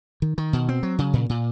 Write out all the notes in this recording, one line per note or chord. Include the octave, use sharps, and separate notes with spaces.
D#3
D#3
B2
C4
F#3
C#3
A#2
A#2